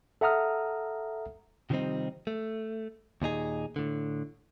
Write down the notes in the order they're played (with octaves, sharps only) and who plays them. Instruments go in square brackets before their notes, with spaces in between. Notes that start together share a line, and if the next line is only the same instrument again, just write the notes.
[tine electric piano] A4 E5 F#5 A#5 D#6 F6
[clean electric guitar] C3 D#3 F3 G3 C4 D#4
A3
D#2 A#2 D#4 G#4
A2 D3